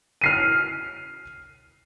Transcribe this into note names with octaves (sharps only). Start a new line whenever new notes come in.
F6 C7 D#7